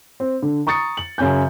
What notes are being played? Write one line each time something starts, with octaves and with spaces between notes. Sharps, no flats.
C4
D3
A#5 C#6 D#6 A6 C#7
F#7
F#2 C#3 C#4 G#5 G6